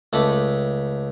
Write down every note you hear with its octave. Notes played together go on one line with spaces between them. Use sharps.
C#2 A3 A4 B5 D6